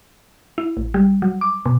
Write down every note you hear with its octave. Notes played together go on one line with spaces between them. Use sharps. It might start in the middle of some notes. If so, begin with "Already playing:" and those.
E4
A1
G3
F#3
D6
B2